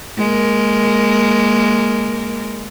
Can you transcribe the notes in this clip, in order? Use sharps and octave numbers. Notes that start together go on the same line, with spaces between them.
G#3 A#3 A#4